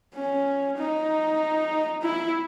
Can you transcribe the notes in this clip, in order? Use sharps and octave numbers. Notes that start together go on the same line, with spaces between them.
C#4
D#4
E4